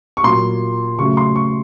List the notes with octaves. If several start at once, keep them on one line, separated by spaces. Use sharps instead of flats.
C#6
A#2 F#3 A#3 C6
C#3 F#3 A3 C#6
C6
C#6